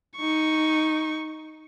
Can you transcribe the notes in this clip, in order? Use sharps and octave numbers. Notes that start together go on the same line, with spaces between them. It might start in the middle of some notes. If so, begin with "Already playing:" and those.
D#4 C#6